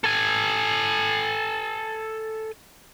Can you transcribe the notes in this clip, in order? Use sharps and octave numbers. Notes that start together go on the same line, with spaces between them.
A4 G#5